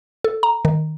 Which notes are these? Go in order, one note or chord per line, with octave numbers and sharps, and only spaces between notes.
A4
A#5
D#3